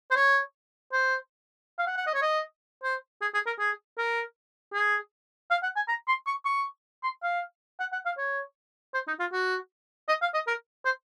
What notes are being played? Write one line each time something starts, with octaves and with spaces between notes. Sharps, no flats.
C5
C#5
C5
F5
F#5
F#5
D#5
C#5
D#5
C5
G#4
G#4
A#4
G#4
A#4
G#4
F5
F#5
G#5
A#5
C6
C#6
C#6
C6
F5
F#5
F#5
F5
C#5
C5
D#4
F4
F#4
D#5
F5
D#5
A#4
C5